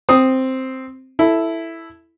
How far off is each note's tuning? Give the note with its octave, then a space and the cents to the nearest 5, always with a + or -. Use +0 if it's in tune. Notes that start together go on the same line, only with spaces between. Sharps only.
C4 +0 D#6 +0
E4 +0 A4 +0